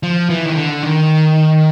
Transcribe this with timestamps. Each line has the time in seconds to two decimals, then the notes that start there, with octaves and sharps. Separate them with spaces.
0.03 F3
0.30 E3
0.46 D#3
0.56 D3
0.83 D#3